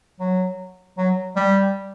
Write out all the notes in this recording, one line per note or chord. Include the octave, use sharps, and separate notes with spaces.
F#3
F#3
G3